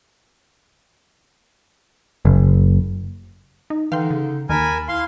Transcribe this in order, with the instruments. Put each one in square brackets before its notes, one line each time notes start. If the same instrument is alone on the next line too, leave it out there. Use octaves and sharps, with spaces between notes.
[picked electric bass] F#1
[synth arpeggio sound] D#4
[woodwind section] D3 D#4 [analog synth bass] E3 [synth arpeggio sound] F5 G5 C6
[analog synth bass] C#3
[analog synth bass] D#2 [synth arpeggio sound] D#3 [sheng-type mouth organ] A#4 G#5 [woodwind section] A5 B5
[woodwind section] E4 [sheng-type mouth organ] F5 C6